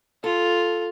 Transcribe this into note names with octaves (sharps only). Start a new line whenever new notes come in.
F4 A4